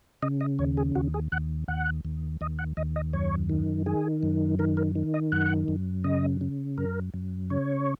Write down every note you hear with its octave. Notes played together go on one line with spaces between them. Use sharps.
C#3 D#5
D#5
D#2 C#5
G#4
D#2 F#4
G#4
D#2 F#5
D#2 F#5
D#2
D#2 D#5
F#5
D#2 D#5
D#5
F#2 C#5
D#3
D#3 G#4
F#2
D#3 A#4
A#4
D#3
D#5
F#2 F#5
F#2
C#3 D#5
C#3
F#2 A#4
F#2
C#3 C#5